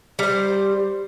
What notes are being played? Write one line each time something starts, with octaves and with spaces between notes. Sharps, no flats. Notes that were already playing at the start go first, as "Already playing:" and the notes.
G3 C5